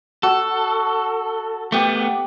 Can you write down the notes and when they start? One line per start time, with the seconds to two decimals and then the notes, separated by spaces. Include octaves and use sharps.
0.23 F#4 A4
1.72 A3 B3 G4 D6